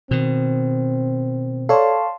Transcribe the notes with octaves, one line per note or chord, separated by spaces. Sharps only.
B2 D#3 C4
A4 C#5 D5 F5 A5 C6